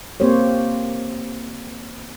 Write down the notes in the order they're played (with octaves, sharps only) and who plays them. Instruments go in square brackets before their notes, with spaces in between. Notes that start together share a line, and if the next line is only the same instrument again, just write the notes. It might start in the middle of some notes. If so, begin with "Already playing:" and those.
[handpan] A#3 C4 G4 C5 C#5